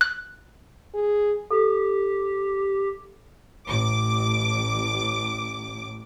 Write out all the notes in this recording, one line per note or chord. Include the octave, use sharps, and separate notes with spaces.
F#6
G#4
G4 A4
A1 D6